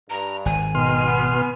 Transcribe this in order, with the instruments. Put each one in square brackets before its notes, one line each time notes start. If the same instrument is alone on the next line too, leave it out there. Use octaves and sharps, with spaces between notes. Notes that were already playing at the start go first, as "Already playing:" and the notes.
[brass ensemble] G2 [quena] A#5
[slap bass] G#1 [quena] G#5
[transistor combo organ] B2 C6 F6 [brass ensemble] D#3
[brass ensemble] B3